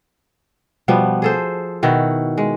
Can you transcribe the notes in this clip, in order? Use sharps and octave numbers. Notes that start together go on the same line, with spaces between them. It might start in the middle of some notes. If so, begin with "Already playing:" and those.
B2 F3 G3 B3
G#4 A4 C5
B2 D#3 E4 F#4
G#3